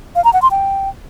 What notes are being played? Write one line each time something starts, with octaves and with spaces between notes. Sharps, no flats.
F5
A#5
F#5
C6
G5